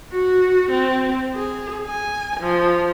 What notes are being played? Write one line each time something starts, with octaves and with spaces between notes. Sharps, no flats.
F#4
C4
G#4
G#5
F3